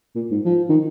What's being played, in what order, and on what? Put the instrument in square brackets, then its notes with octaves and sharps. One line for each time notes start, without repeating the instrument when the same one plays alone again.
[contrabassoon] A#2
G#2
F3
D#3